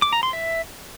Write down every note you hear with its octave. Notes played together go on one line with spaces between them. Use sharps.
D6
A#5
C6
E5